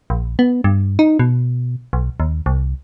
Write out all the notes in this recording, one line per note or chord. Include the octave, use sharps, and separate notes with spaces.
A#1
B3
G2
D#4
B2
B1
D#2
C2